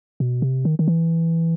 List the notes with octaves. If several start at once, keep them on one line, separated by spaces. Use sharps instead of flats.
B2
C3
D#3
D#3
E3